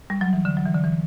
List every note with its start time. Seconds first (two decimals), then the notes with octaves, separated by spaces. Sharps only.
0.10 G3
0.21 F#3
0.33 E3
0.45 D3
0.57 F#3
0.66 E3
0.75 D3
0.84 E3